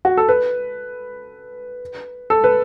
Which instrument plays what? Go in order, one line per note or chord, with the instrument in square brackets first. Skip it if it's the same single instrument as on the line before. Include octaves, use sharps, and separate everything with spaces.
[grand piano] F#4
A4
B4
A4
B4